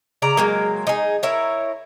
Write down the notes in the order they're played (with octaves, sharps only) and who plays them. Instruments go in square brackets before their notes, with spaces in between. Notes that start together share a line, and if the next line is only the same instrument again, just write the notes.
[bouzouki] C#3 D5 A#5
F#3 G#3 A#3
D#4 G#4
E4 A#4 C#5